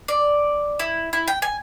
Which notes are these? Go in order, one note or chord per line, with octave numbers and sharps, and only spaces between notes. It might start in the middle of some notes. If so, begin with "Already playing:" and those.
D5
E4
E4
G5
G#5